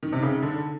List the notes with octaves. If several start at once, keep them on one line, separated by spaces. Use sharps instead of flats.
D#3
C3
C#3
D#3
D3